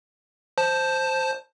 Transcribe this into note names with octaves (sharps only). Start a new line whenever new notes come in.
C5 A5